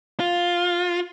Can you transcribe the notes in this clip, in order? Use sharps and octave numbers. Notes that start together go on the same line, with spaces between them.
F4